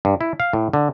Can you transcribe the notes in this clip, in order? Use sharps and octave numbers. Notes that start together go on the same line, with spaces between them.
G2
E4
F5
A2
D3